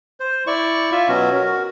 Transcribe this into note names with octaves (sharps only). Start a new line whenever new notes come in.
C5
E4 D5 C#6
F4 E5
B2 F#3 C#4 F#4
F#4 A#4